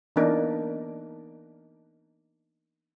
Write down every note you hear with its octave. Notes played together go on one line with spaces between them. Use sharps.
E3 A#3 B3 D4 D#4 A#4